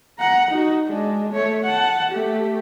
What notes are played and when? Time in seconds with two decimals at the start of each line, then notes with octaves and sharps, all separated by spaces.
0.18 F#5 A#5
0.51 D#4 F#4
0.87 G#3 D4
1.32 A3 C#5
1.63 F#5 A5
2.11 A3 G4